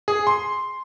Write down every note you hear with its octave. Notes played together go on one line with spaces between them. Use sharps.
G#4
C6